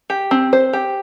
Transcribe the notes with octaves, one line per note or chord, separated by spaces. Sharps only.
G4
C4
C5
G4